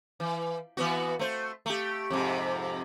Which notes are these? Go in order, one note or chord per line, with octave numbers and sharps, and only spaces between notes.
E3
E3 B3 F#4
A3 C5
A3 G4
F2 G#2 C3